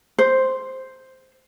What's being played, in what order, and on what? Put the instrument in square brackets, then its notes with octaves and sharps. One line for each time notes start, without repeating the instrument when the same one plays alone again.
[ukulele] C5